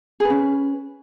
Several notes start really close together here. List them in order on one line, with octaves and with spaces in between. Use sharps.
G#4 B4 C#4